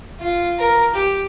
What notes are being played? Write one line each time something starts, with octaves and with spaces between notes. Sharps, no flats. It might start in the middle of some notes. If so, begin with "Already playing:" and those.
F4
A#4
G4